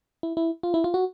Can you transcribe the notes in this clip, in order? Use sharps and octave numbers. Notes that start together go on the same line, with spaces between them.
E4
E4
F4
E4
F4
F#4